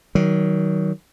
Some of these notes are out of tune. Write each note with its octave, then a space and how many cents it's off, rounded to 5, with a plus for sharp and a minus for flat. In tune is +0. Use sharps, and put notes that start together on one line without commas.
D#3 +15 F#3 +30